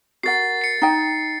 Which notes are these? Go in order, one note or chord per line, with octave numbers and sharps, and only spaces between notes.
F#4 A#4 F#5 A6 C7
C7 C#7
D#4 G5